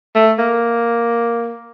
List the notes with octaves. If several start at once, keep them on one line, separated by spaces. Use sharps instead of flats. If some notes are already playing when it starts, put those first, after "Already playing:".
A3
A#3